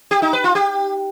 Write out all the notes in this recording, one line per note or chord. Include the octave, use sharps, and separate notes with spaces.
G4
D#4
B4
F4
G4